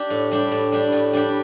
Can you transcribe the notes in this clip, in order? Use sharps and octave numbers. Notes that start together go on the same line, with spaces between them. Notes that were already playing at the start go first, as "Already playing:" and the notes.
Already playing: D4 G4
A2
G3 D4 G4
A2
G3 D4 G4
A2
G3 D4 G4